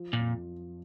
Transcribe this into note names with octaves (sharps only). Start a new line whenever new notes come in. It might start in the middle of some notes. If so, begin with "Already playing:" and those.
Already playing: F3
A#2
F2